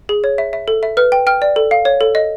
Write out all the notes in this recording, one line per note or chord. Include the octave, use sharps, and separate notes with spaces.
G#4
C#5
E5
E5
A4
E5
B4 F6
G5
G5 F6
D5
A4
F5
C#5
A4
D#5